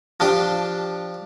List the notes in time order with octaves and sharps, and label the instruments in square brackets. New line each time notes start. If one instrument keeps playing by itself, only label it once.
[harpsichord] F3 D4 G4